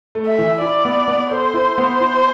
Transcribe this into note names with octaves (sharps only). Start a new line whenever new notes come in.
A3
E5
E3
E4 D5
B3
B3
A4 C5
E4
B3
E4